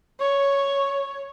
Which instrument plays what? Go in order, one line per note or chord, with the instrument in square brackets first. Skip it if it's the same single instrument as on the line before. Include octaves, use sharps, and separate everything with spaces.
[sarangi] C#5 [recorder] C#6